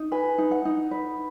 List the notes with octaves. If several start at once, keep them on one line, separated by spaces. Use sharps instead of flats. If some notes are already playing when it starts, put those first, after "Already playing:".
Already playing: D#4
B4 G#5
D#4
F#5
D#4
B4